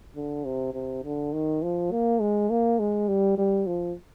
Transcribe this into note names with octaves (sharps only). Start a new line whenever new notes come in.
D3
C3
C3
D3
D#3
F3
A#3
G#3
A#3
G#3
G3
G3
F3